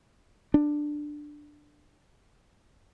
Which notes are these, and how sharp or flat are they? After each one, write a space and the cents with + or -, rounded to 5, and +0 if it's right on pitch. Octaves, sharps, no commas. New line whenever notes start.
D4 +10